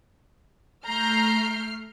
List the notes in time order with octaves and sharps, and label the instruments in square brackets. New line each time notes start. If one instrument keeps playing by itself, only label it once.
[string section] A3 F6 C7 [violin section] A#5 G6